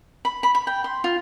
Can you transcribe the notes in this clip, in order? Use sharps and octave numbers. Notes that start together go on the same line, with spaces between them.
B5
B5
B5
G5
C6
F4